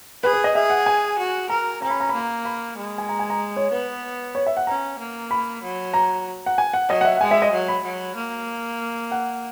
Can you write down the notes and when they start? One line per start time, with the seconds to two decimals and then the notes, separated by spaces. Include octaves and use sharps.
0.23 G#4 B4
0.33 B4
0.44 D#5
0.55 G#4 E5
0.70 F#5
0.86 G#5
1.18 F#4
1.50 A#4 A#5
1.82 C#4 A#5
1.90 B5
2.00 A#5
2.09 B5
2.14 A#3 A#5
2.45 B5
2.77 G#3
2.98 G#5
3.09 A#5
3.19 G#5
3.30 A#5
3.56 C#5
3.72 B3 B4
4.35 C#5
4.47 E5
4.57 F#5
4.67 C#4 A#5
4.99 A#3
5.31 B5
5.63 F#3
5.94 A#5
6.46 F#5
6.58 G#5
6.74 F#5
6.89 F#3 D#5
7.01 F#5
7.05 E5
7.17 F#5
7.21 G#3 G#5
7.31 E5
7.42 D#5
7.52 F#3
7.68 B5
7.84 F#3
8.16 A#3
9.11 F#5